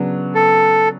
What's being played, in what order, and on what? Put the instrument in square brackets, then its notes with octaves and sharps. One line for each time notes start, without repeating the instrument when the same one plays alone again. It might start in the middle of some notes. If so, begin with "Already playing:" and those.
Already playing: [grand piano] C#3 F#3 B3 D4
[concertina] A4